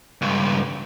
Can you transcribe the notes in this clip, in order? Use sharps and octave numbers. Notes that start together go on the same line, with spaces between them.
C#2 G2